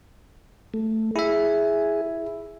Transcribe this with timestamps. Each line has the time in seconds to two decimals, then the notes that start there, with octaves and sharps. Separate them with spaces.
0.74 A3
1.16 E4 G#4 E5